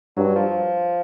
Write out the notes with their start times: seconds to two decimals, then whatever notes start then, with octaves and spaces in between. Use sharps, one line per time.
0.17 G2 F#3
0.36 F3